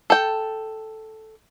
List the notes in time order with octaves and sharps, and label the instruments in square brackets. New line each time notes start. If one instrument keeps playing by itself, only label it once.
[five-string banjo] A4 G5